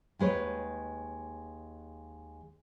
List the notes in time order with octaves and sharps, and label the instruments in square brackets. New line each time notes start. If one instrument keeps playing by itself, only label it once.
[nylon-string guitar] D#2 G#3 B4 C#5